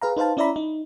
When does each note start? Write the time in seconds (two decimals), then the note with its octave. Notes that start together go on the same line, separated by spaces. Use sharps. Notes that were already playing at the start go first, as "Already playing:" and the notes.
0.02 G#4 B4 F5 A#5
0.17 D#4 B4 C5 F5 A5
0.37 C#4 E4 D5 E5 A#5 B5
0.56 D#4